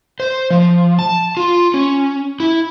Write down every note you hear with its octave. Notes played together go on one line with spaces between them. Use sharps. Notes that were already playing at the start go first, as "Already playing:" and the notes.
C5
F3
A5
F4
C#4
E4